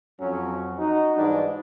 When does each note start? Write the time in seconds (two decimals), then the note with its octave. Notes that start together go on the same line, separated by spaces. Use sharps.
0.20 F2 F#3 C#4
0.78 D#4 F#4
1.16 G#2 E3 G3 G#3 D4 D#4